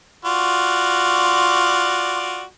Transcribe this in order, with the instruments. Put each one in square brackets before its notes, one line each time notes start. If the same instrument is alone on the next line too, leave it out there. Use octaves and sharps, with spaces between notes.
[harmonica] F4 F#4 D5